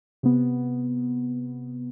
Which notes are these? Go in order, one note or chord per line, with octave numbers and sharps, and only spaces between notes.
C3 B3